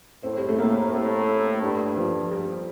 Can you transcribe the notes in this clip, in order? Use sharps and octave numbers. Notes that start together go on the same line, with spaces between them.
A2 C4
G3
A3
A2 A#3
A2 A#3
G2 A3
F3
G3